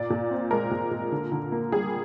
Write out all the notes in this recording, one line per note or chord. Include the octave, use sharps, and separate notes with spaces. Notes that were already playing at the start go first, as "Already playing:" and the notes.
Already playing: A#2 D5
A#2
C4
G#3 A#4
A#2
A#2
D3
D3
A#3
G3 G#4